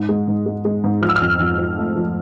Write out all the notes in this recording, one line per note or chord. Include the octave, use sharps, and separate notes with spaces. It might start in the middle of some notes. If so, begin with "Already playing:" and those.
Already playing: G#2
G#3
G#2
G#3
G#3
G#2
F3 F6
E6
F6
F2
F2
F3
A3
F3